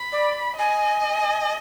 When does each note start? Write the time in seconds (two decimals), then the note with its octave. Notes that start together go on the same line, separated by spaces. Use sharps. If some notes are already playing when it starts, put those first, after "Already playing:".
Already playing: B5
0.12 D5
0.58 D#5 G#5